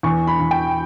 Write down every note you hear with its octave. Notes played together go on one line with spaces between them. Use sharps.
E2 C#6
B5
E2
G5